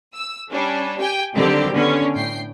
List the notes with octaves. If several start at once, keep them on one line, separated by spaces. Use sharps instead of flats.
E6
G3 C#4 D4
G4 G5 G#5
D3 D#3 F#3 G3 C4 G4
D3 B3 C#4
A2 G5 C7